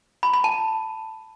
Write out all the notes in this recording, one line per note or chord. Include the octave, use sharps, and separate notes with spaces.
B5
B5
A5